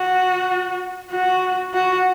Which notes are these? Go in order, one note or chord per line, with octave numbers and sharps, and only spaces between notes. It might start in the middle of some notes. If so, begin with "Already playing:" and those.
Already playing: F#4
F#4
F#4